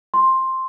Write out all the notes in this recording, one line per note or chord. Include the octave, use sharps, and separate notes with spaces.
C6